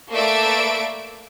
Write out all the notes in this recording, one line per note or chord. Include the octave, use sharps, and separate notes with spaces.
A3 A#3 B4 D5 E5 D7